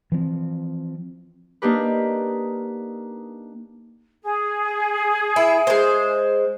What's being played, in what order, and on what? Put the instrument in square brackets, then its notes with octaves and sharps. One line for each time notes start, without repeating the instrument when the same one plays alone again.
[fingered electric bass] E3 F3 C4
[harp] A#3 D4 D#4 G4 B4
[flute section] G#4
[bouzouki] E4
G#3 C5